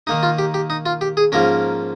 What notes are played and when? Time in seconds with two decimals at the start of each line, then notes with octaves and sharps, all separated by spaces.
0.07 D#3 A#3 D#4
0.23 F4
0.38 G4
0.54 G4
0.70 D#4
0.86 F4
1.01 G4
1.17 G#4
1.32 G#2 F3 A#3 C#4 A#4